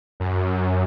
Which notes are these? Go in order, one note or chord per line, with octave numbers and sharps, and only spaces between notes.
F#2